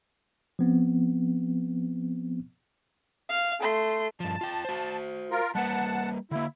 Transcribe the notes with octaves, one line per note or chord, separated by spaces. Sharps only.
F3 B3 C4
F5
A3 C6
G2 F3 A5
F4 G5
F#4 C5
F4 A#4
G3 A#3 B4 F#5 A5
D3 A#3 E4